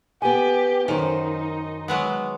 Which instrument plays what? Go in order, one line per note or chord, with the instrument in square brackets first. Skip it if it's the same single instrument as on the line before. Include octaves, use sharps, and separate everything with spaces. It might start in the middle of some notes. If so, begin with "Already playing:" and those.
[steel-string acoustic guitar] B3 G#5 [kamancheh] G4
[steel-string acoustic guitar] F#2 C5 [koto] D#3 [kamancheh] D#4
[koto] F#3 G#3 B3